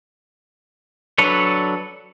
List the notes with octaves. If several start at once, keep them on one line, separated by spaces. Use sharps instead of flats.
F#3 D4 A4 B4 C#5